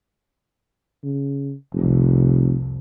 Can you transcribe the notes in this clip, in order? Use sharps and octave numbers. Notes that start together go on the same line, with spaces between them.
C#3
F1 C2 F2